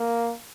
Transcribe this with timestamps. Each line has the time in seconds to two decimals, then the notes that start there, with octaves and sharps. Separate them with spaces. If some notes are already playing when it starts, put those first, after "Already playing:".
Already playing: A#3